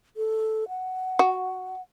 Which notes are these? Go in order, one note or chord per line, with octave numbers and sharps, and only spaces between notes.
A4
F#5
F#4